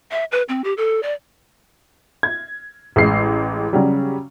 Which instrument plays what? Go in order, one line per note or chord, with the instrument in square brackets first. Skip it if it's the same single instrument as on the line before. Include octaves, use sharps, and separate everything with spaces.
[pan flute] E5
B4
C4
G4
A4
D5
[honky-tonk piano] G#6
A1 G#3 E6 C7
C#3 F#3 G3